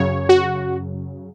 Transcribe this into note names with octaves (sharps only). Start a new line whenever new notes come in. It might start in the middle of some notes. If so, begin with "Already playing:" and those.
Already playing: F#2 C#3 F#3 C#5
F#4